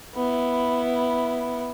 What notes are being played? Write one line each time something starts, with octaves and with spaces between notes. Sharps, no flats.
B3 E4